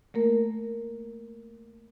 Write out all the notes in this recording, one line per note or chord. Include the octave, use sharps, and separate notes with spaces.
A3 A#3 A#4